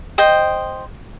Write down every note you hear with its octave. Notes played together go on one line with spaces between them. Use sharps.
C5 D#5 G5